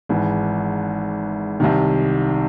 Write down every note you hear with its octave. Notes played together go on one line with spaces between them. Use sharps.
G#1 G#2 E3
C2 C3 D#3